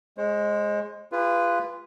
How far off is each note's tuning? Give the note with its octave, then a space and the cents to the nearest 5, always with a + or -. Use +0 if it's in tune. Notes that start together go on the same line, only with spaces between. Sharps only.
G#3 +0 C5 +35
F4 -20 G#4 -40 B4 +0